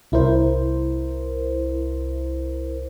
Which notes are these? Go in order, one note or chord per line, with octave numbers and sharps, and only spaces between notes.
C2 E4 A#4 C5